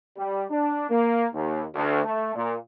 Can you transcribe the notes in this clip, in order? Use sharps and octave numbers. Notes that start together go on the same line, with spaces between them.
G3
D4
A#3
D#2
D2
A3
A#2